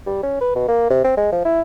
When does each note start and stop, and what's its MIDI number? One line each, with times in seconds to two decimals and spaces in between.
0.06 0.22 55
0.23 0.39 61
0.41 0.55 71
0.55 0.67 47
0.68 0.87 58
0.90 1.04 48
1.04 1.15 60
1.17 1.29 56
1.32 1.45 53
1.45 1.62 64